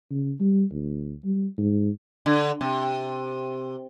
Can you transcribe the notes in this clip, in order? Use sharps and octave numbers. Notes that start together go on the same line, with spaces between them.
C#3
G3
D2
G3
G#2
D3
C3